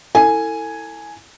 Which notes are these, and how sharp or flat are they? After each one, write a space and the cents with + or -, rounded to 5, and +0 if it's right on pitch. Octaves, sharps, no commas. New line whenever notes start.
E4 -5 A4 +30 G#5 +0